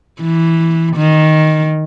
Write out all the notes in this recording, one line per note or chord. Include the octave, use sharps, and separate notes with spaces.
E3
D#3